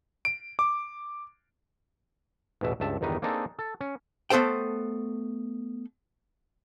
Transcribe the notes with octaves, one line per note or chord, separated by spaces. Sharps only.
D7
D6
A1 E2 B2 E5
C#2 G2 E5 A5
G1 E2 D#3 G3 D#4 B4
A#3 C4 D4 D#4 G#4 A4
A4
C#4
A3 B3 A4 C5 G5